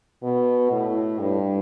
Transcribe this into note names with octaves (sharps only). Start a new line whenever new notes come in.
B2
A2
G2